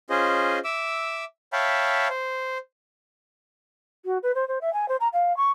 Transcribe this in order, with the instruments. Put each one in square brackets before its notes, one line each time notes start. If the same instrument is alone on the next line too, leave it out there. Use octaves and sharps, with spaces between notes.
[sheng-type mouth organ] C#4 F4 G#4 C5 D#5
E5 D6 E6
C#5 E5 F5 G5 A5 B5
C5
[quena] F#4
B4
C5
C5
E5
G#5
C5
A#5
F5
C#6